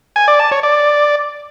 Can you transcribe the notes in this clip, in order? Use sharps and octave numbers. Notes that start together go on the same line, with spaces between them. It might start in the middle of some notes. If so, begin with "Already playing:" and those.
G#5
D5
A5
C#5
D5